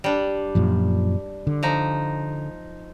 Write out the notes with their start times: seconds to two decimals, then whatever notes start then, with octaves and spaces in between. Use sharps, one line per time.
0.04 G3 D4
0.55 F#2 A#2 F3
1.47 D3
1.63 F3 D#4